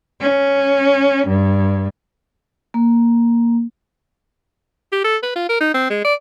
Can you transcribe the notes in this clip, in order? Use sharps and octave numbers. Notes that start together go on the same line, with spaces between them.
C#4
G2
A#3
G4
A4
B4
F4
A#4
D#4
C4
G#3
D5